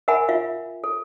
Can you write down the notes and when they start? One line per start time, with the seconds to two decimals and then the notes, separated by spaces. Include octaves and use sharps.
0.08 A#4 E5 F#5 G#5 B5
0.29 F4 E5 F5
0.84 A4